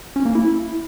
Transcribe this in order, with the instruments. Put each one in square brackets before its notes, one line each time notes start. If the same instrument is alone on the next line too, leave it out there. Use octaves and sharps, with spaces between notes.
[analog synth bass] C#4
A#3
E4